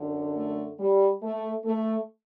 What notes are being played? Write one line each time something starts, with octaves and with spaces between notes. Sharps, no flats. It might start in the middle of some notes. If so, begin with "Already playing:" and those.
Already playing: F#2 D3
A3
G3
A3
A3